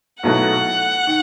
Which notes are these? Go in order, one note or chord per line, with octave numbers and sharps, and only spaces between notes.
B1 B2 F#3 A3 E4 F#5
D#3